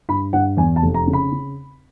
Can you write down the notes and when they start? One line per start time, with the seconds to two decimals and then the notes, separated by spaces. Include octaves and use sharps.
0.09 G2 B5
0.33 G2 F#5
0.57 E2 G#5
0.76 A5
0.82 F1
0.94 A#5
1.07 C#3
1.13 B5
1.32 C#3